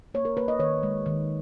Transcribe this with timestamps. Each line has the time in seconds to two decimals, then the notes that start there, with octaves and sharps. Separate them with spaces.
0.14 A#3 C#5
0.25 A#4
0.37 A#3 B4
0.48 D#5
0.59 D#3 C#5
0.83 G#3
1.06 D#3